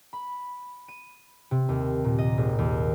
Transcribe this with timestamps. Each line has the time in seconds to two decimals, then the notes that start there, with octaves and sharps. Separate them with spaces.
0.13 B5
0.88 D#7
1.51 C3
1.69 D#2
2.04 A#2
2.18 D#5
2.38 G#1
2.58 D#2